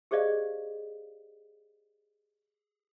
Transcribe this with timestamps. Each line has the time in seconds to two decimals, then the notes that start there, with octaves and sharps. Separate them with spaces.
0.11 G4 G#4 C5 D5 D#5 F5